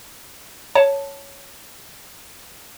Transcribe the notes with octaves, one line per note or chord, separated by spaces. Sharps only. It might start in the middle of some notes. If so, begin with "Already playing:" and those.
C#5 A5